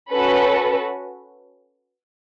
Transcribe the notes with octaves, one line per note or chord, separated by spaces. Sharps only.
C#4 F#4 A4 B4